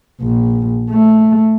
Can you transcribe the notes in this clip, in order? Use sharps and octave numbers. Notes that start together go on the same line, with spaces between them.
A#1
A3